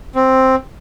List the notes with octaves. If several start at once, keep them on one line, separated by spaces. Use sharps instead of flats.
C4